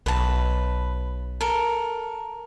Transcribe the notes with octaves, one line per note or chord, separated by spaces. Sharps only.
B1 B4 A5
A4 A#4